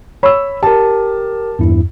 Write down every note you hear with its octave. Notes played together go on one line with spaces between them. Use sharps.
C#5 B5 E6
G4 A#4 A5
E2 G2 E4